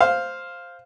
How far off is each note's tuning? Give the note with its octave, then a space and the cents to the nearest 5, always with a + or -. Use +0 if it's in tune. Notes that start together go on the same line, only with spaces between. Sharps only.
C5 +0 F5 +0